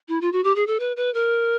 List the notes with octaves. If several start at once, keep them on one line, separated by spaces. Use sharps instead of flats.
E4
F4
F#4
G4
G#4
A4
B4
B4
A#4